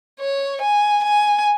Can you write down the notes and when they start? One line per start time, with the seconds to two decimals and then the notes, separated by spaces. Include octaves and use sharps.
0.20 C#5
0.62 G#5
1.04 G#5